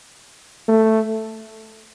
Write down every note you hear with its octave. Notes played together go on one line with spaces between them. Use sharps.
A3